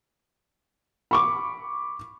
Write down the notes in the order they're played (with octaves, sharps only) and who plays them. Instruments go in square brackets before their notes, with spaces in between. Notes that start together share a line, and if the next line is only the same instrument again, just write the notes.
[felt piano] B5 C#6 D6